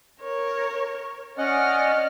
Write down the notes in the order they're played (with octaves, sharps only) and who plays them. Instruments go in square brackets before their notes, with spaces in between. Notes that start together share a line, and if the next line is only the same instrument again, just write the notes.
[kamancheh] A#4 C#5
[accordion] C#4 D#5 F#5 [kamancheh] D5 F6